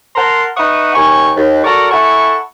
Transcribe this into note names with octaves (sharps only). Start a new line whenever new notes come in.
A#4 F#5 A5 A#5 C6
D#4 B4 E5 F#5 C#6 D#6
D#2 G#5 C#6
D#2
F#4 A4 A#4 D5 A#5 C#6
E4 A4 F#5 G#5 C#6